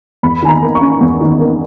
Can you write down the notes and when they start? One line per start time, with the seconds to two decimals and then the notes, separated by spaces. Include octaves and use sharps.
0.23 E2 B5
0.42 D#3 G#5
0.49 A#5
0.62 A#3
0.75 C#6
0.81 C#4
1.01 E2
1.21 D#3
1.40 A#3